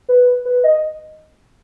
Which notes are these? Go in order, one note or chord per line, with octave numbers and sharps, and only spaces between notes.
B4
B4
D#5